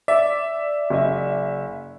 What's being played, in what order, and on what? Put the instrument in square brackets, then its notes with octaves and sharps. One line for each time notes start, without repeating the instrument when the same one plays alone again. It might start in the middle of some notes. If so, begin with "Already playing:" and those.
[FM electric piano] D5 [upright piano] E5
[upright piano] F#1 D#5 E5